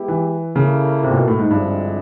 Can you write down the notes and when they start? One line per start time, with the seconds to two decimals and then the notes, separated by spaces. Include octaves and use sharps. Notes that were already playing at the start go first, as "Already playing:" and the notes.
Already playing: G#3 B3 E4 G4
0.08 E3
0.55 C#3 A#3 C#4 E4 A4
1.03 C3
1.10 A#2
1.15 B2
1.28 A2
1.39 G#2
1.50 G2 D3 F3 G#3 C4 E4